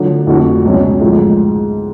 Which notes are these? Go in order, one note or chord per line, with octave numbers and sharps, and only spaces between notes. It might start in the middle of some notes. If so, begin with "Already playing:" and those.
Already playing: D3 F#3 A3 D4 F4
F2 F3 A3 D4 F#4
C#2 B2 F#3 C#4
G#2 F3 A3